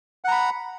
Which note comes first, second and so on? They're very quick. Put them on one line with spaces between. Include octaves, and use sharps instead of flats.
F#5 A#5 B5